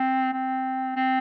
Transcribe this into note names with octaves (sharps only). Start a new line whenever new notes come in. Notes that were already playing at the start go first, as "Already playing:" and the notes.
Already playing: C4
C4
C4